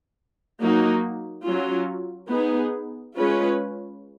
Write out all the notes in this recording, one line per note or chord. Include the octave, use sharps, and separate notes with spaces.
F#3 A#3 D#4 F#4
F#3 C#4 F4
B3 D#4 G#4
G#3 C#4 F4 B4